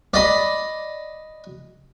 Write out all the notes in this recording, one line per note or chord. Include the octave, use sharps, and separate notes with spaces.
D5 D#5 B5